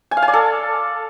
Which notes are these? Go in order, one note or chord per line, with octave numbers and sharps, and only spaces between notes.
G#5
F5
G#5
D5
A4